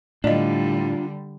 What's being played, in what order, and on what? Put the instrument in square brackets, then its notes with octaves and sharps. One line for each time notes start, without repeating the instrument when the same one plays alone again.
[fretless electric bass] A2 [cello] D3 G3 [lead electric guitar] D4 F4 [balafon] D5 D#5